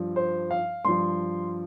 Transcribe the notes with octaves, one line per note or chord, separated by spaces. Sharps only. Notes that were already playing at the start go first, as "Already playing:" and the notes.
Already playing: G2 F3
C5
F5
G2 F3 C6